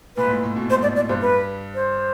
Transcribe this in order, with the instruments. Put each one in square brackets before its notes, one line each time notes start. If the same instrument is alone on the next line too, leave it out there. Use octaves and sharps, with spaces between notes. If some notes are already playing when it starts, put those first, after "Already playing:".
[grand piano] A#2 [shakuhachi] B4
[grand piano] G#2
A2
A2
B2
[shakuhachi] C5
[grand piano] G#2
[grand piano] A2 [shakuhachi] D5
[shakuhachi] D5
[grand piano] G2 [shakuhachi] C5
[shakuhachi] B4
C5